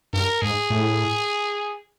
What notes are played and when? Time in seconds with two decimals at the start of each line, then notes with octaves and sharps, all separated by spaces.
0.13 G2 A#4
0.42 G#2 G#4
0.70 A2